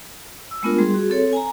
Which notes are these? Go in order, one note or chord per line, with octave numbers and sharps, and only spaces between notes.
E6
G#3 A3 B3 D4 F4 A#4
G3 G#4 C6
F#4 G#4
C4 A4 C#5
G#5 A#5